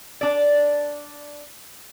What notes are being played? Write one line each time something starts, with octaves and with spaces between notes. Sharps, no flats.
D4 D5